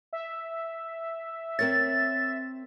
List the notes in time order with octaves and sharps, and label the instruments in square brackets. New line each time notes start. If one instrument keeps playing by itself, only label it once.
[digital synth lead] E5
[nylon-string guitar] C4 A#4 C#5 [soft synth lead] A6